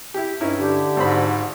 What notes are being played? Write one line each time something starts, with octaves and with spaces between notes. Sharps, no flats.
E4 G4
G2 C#4 D#4 E4
D3 G4
G#1 G#2 C5 B5